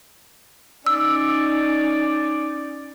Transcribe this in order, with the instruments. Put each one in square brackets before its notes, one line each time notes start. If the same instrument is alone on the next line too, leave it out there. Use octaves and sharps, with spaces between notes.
[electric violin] C#4 D#4 [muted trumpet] D5 [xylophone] E6